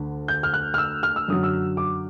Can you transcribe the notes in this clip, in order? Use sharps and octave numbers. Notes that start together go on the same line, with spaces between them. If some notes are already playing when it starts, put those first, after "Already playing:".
Already playing: D2 D3
G6
F6
F#6
F6
E6
F6
E6
F#2 D3 F#3 D#6
E6
D6